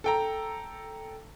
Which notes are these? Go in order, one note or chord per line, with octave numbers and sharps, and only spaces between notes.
A4 G5 A#5